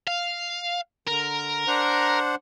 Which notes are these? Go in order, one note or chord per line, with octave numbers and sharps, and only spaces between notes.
F5
D3 A#4
D4 C5 F#5